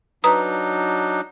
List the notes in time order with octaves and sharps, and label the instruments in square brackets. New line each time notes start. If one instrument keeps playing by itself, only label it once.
[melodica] F#3 D4 D#4 [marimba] B4 A#5 D#6